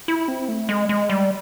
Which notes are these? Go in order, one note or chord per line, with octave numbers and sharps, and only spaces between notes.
E4
C4
A3
G#3
G#3
G3